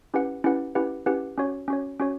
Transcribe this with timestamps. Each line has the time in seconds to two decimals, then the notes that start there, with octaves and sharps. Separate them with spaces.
0.14 C#4 E4 G4 B4 F#5
0.44 C#4 E4 G4 B4 F#5
0.75 C#4 E4 G4 B4 F#5
1.06 C#4 E4 G4 B4 F#5
1.37 C#4 F#4 C#5
1.68 C#4 F#4 C#5
1.99 C#4 F#4 C#5